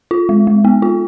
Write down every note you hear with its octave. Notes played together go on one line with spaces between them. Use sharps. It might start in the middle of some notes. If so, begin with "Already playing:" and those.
F4
G#3
G#3
B3
F4